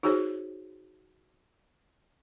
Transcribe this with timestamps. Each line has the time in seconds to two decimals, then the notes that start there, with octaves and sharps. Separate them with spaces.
0.03 D#4 F4 F#4 G#4 C5 C#5